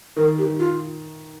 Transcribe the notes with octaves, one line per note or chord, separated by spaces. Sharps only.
D#3 A#4
G4
D#3
F4